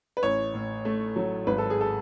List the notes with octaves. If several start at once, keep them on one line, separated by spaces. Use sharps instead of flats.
B4
A1 C#5
A2
A3
F#3
G#1 B4
A4
G#4
A4